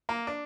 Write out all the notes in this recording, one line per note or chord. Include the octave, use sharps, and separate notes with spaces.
A#3
D4